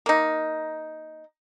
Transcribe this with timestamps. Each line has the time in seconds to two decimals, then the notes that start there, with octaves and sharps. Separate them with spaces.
0.06 A#3 D#4